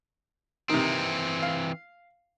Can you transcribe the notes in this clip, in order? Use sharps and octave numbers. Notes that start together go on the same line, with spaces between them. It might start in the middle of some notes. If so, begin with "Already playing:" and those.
C3 D#3 E3 C4
F5